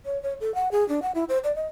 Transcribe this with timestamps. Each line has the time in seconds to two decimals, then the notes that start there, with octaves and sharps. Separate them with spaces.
0.05 C#5
0.23 C#5
0.41 A4
0.55 F#5
0.72 G#4
0.89 D4
1.02 F#5
1.15 E4
1.29 C5
1.44 D5
1.55 D#5